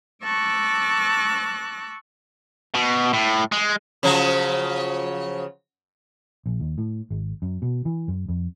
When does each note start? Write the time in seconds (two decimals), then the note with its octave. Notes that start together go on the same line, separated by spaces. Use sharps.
0.24 A5 C#6 D6 E6 F#6 A#6
2.75 B2
3.14 A2
3.52 G#3
4.03 C#3 F3 F#3
6.46 A#1
6.60 D#2
6.78 A2
7.10 G#1
7.42 F#2
7.62 B2
7.85 E3
8.08 F#2
8.29 F2